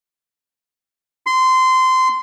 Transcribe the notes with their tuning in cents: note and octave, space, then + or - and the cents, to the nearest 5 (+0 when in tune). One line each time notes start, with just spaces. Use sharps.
C6 -20